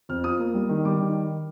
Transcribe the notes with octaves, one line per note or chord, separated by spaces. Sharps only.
F2 F6
F4 D#6
A#3
G3
D#3
G3 D6
D#3